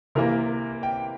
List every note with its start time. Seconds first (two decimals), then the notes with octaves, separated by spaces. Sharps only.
0.15 C3 E3 A#3 A#4
0.83 G5